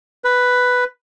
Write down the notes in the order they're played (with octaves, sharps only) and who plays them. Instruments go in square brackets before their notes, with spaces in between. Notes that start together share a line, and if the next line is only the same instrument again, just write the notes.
[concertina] B4